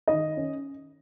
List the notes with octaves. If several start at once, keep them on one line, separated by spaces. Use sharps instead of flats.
D#3 D#5
C#4